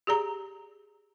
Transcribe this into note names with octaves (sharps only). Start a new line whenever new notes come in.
G4 G#4 D5 A#5